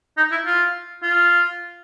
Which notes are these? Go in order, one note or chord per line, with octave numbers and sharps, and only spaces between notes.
D#4
E4
F4
F4